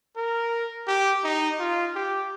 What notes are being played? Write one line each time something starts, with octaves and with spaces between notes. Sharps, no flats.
A#4
G4
D#4
F4
G4